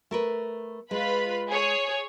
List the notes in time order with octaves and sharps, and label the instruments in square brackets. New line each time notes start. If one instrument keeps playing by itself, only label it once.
[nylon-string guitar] A3 A#4 B4
[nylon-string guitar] G#3 [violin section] F4 B4 B5
[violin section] G#4 C#5